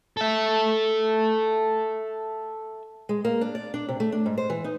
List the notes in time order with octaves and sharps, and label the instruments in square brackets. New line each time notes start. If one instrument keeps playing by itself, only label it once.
[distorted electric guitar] A4 E5
[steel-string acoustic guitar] G#3
A#3
D4
D5
D4
C3
A3
D4
G#2
C5
E3
D#4